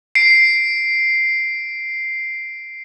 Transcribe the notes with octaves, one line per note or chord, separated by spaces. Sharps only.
C7 D7